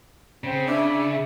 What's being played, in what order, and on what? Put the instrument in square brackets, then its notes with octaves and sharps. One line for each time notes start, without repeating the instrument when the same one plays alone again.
[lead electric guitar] C#3 [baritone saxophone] C4
[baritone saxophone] D4 [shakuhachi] E5